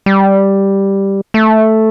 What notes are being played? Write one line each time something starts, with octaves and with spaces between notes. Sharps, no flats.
G3
A3